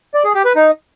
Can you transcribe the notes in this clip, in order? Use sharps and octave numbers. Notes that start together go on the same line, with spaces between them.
D5
G#4
G4
B4
D#4